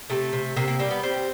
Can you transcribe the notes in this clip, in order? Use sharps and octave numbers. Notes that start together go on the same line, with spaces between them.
C3 A3
C3
C3 A#3
A#3
G3 A#3
B3
G3 C4